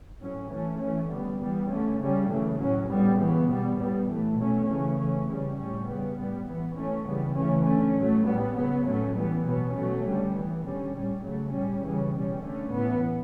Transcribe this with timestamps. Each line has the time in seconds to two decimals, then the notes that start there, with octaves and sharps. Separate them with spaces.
0.20 A2 F#3 C#4
0.50 E3 A3 C#4
0.80 E3 A3 C#4
1.09 D3 G3 B3
1.39 E3 G3 B3
1.69 D3 A3 C#4
2.00 C#3 G3 C#4
2.28 C#3 E3 A3
2.59 A2 F#3 C#4
2.89 A2 G3 B3
3.19 C#3 E3 B3
3.49 B2 G3 B3
3.78 A2 G3 B3
4.08 A2 E3 A3
4.37 B2 F#3 A3 C#4
4.67 C#3 E3 A3 C#4
4.98 E3 A3 C#4
5.27 C#3 G3 C#4
5.57 A2 G3 C#4
5.86 C#3 G3 B3
6.17 A2 G3 B3
6.46 E3 B3
6.76 E3 A3 C#4
7.06 C#3 E3 G3 B3
7.36 C#3 E3 A3 C#4
7.65 D3 A3 C#4
7.96 A2 F#3 A3
8.26 A2 G3 B3
8.55 C#3 F#3 B3
8.85 A2 F#3 A3 C#4
9.15 E3 G3 B3
9.45 B2 F#3 B3
9.74 B2 F#3 A3 C#4
10.04 D3 G3 C#4
10.35 E3 B3
10.65 D3 G3 C#4
10.94 A2 G3 C#4
11.24 C#3 F#3 A3
11.54 A2 G3 C#4
11.83 C#3 E3 G3 C#4
12.13 B2 G3 C#4
12.43 D3 A3 C#4
12.73 A2 E3 B3